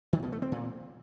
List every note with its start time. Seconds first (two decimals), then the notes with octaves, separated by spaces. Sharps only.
0.13 D#3
0.23 B2
0.32 A3
0.42 C4
0.52 A#2